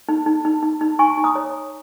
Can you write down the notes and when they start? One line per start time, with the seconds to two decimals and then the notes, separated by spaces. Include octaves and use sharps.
0.09 D#4
0.26 D#4
0.45 D#4
0.63 D#4
0.81 D#4
0.99 D#4 G#5 C#6
1.17 D#4
1.24 A#5 D#6
1.35 C#5